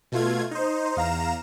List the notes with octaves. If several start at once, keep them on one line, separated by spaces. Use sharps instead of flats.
B2 A3 F4 G#6
D#4 C5
E2 F5 A#5 E7